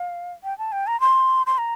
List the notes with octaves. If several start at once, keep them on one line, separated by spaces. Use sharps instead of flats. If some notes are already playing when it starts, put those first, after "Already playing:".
Already playing: F5
G5
A5
G5
A#5
C6
C6
A#5